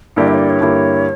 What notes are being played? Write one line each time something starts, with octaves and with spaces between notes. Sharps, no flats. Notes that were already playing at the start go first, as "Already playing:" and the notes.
G2 D3 A#3 E4 G4 D5
E5
C#5
D5
C#5
G2 D3 A#3 E4 G4